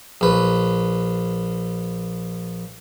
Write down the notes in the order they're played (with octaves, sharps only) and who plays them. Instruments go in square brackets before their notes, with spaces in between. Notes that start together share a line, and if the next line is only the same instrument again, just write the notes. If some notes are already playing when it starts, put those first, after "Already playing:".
[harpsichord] A#1 B4